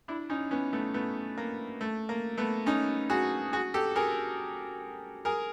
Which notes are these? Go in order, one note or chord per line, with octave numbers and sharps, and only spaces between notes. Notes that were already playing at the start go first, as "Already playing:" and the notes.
D4 E4
C#4 D#4
B3 C#4
A3 B3
A3 B3
A#3
A3
A#3
A3 B3
C#4 D#4
F#4 G#4
F#4 G#4
G4 A4
G#4 A#4
G#4 A#4